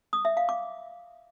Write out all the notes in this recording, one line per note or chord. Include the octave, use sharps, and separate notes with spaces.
D#6
E5
F5
D6